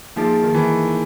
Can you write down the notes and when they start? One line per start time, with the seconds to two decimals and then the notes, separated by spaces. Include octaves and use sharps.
0.16 F3 A#3 D#4 G#4
0.43 D#3
0.54 E3